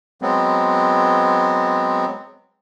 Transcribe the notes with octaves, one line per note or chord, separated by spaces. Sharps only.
F#3 G#3 B3 C4